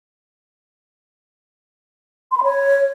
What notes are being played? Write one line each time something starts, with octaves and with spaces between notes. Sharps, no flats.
C6
B5
C#5